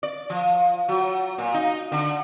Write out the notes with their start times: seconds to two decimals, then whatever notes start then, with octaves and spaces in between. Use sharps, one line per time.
0.03 D5
0.30 F3
0.88 F#3
1.38 A#2
1.54 D#4
1.92 D3